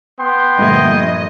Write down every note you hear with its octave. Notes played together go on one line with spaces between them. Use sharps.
B3 G5 C6
G2 A#2 D3 F3 A3 D#5 G#6